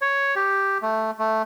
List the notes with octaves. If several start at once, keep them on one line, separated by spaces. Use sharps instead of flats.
C#5
G4
A3
A3